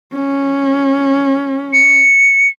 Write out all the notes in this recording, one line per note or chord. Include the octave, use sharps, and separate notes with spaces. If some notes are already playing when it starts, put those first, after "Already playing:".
C#4
C#7